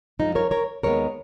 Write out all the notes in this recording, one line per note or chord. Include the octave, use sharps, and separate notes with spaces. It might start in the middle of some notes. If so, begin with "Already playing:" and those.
F#2 F3 G#3 D#4
A#4 C#5
A#4 C#5
D#2 D#3 G#3 B3 A#4 C#5